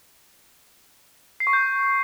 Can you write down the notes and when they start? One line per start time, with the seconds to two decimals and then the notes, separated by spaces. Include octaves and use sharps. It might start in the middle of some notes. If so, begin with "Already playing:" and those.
1.40 C7
1.47 C#6
1.53 G6